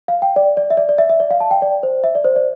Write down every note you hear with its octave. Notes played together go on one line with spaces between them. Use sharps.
F5
G5
D5
D5
E5
D5
D5
E5
E5
D5
F5
A5
G5
D5
C5
E5
D5
C5
D5